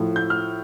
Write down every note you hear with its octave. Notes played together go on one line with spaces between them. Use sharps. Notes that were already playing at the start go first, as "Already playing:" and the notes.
Already playing: A2 F3
G6
F6